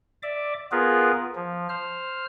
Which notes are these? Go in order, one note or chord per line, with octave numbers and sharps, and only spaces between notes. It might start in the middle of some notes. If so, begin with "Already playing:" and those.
D5 E5 D6
B3 F4 G#4 A#4 B4
F3
C5 F6